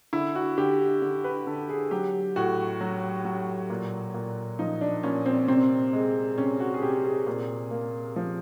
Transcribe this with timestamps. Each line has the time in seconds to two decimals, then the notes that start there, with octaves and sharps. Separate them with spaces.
0.13 D3 E4
0.35 F#4
0.58 D3 G4
1.02 D3
1.24 B4
1.47 D3 A4
1.69 G#4
1.91 F#3 G4
2.36 A2 F#4
2.81 F#3
3.25 F#3
3.70 A#2
4.14 A#2
4.59 F3 D#4
4.81 D4
5.03 A#2 C#4
5.26 C4
5.48 C3 C4
5.93 G#3
6.38 C3 C#4
6.60 F#4
6.74 G#4
6.82 C3 G4
7.05 G#4
7.27 A#2
7.71 A#3
8.16 F3